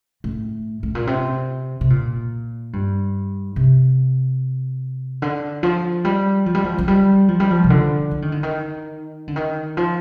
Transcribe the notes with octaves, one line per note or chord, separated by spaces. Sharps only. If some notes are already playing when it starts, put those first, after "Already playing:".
A2
A2
A#2
C3
C3
A#2
G2
C3
D3
F3
G3
F3
G3
F3
F3
G3
F3
G3
F3
C3
D3
F3
D#3
D3
D#3
D3
D#3
F3